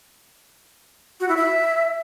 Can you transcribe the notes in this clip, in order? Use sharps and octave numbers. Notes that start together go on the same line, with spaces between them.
F#4
E4
E5